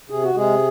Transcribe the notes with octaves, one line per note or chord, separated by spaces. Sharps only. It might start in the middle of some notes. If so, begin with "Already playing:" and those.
C3 G#4
F#4
C3 G#3 G#4